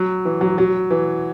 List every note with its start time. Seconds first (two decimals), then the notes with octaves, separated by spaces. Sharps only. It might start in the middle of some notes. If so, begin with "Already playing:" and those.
Already playing: F#3
0.25 E3
0.41 F#3
0.58 F#3
0.90 E3